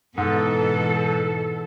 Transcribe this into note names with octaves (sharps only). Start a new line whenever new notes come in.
G#2 B2 E3 A4